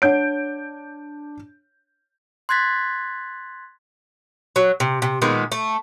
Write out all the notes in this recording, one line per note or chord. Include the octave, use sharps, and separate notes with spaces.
D4 C#5 F#5 G6 D7
C6 F#6 G#6 A6 B6
F#3
C3
C3
A#2 D#3 G#3 B3
A3